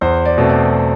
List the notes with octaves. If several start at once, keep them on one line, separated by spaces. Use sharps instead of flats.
E2 C5
D5
B2 A3 C4
D5